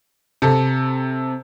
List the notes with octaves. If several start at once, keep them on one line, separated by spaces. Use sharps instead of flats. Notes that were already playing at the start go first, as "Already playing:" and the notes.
C3 A4